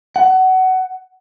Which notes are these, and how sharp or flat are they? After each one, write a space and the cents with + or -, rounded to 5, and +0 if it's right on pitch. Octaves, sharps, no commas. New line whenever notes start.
F#5 +20